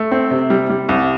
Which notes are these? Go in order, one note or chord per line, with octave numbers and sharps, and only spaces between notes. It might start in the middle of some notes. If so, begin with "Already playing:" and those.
Already playing: A3
C4
C3
G3
G3
C2